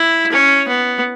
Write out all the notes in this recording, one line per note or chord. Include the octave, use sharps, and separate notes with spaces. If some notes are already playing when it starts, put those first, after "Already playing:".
Already playing: E4
C#4
B3